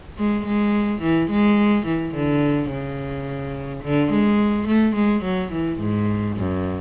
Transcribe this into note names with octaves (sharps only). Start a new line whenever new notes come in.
G#3
G#3
E3
G#3
E3
D3
C#3
D3
G#3
A3
G#3
F#3
E3
G#2
F#2